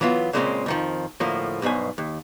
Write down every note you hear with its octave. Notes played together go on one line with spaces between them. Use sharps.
E3 F#3 B3 F4
A#2 C#3 G#3 A#3 C4 C#4
F2 D#3 F3
D2 A2 F3 A#3
B1 G2 B2 C5 G#5
D#2